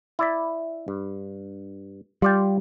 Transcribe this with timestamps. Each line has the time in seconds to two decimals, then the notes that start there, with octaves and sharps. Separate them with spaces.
0.19 E4 D5 E5
0.88 G2
2.22 G3 F4 D5 G5